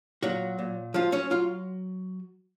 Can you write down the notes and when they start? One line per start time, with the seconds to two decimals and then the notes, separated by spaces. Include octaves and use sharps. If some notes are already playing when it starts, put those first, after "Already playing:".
0.23 A#2 F#3 F#4
0.59 A#2
0.94 F3 F#3 F4
1.12 C#4 C#5
1.30 F#3 F4 F5